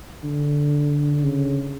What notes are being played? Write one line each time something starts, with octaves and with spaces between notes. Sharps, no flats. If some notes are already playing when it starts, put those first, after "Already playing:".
D3
C#3